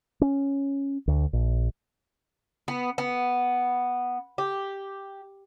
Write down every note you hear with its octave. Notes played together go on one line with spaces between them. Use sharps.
C#4
D2
A#1
B3
B3
G4